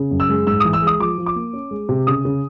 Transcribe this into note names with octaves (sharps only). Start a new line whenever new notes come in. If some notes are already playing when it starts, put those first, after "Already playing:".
Already playing: C#3
F#2
E6
G#3
G#2 E6
E3 D#6
E6
G#3
D#6
F3 D6
F3
D6
A#3
C#4
G#3
C3
C#3 D#6
C#3